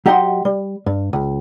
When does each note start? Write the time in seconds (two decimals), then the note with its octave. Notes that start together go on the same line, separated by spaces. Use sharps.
0.06 F#3 G4 D#5 F#5 B5 C6
0.45 G3
0.86 G2
1.13 C#2